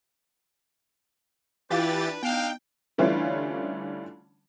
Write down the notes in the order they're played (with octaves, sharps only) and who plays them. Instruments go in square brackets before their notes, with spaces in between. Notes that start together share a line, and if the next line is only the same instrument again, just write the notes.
[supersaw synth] E3 G4 A6 [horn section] D4 B4 [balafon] E4 F4 F5
[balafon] B3 [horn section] D4 D#4 F5 [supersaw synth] G5
[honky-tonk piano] D3 E3 G3 A3 C#4 F4